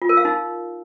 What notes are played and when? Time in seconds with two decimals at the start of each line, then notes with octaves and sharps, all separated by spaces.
0.02 F4
0.09 A#4
0.17 F5
0.25 D#4